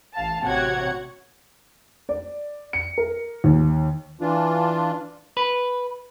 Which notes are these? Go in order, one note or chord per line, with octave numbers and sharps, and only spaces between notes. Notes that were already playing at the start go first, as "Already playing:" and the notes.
A1 F5 A5
A1 C3 F#4 C#5 F#5 G#6
D5
C#7
A#4
D#2
E3 D4 F4
B4